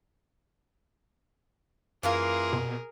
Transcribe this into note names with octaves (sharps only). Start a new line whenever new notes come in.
F#2 E3 A#3 F4 G#4 A#4
B2